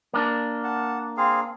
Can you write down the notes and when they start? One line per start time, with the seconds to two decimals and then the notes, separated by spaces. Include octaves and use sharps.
0.14 A#3 D4
0.64 F#5 A5
1.17 C4 G#4 F5